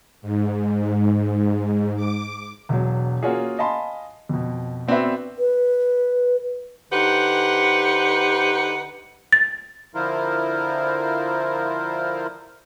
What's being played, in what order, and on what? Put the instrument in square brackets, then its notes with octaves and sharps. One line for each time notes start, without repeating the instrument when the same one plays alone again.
[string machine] G#2
D6
[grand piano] E1 F#3
A#3 C#4 F4 F#4 G#4
D#5 F5 G#5 A5 B5 C6
F2 B2
B3 C4 D4 F#4 B4 E5
[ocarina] B4
[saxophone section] D3 D#4 G4 B4 C5 F#5
[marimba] A6
[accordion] D3 F3 E4 F4 A#4 C5